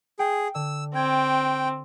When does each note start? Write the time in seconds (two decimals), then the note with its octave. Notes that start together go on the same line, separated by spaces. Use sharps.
0.19 G#4 G5
0.55 D3 E6
0.95 C4 G5 G#6